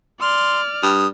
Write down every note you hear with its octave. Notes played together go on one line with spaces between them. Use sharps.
D5 C6 F6
G2 D#6